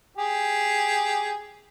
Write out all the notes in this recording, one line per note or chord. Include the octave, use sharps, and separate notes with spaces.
G4 G#4